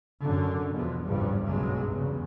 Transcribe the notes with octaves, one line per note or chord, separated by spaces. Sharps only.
F#2 D3
E2 B2 F3 G#3 B3
G#1 E2 G2 C#3 F3 G3
F#1 B1 G2 C#3 F#3 G#3
E2 G2 C#3